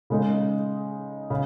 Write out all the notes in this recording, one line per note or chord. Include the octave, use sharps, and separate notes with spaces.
C#3 G#3 D#4
C#3